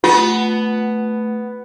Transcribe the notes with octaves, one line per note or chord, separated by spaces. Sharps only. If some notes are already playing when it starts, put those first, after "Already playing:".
A3 B3 F4